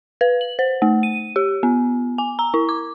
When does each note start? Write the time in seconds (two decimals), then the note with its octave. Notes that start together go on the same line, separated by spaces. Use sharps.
0.21 B4
0.41 F#7
0.59 C5
0.82 A3
1.03 D#7
1.36 G4
1.63 B3
2.18 G#5
2.39 A#5
2.54 E4
2.69 D6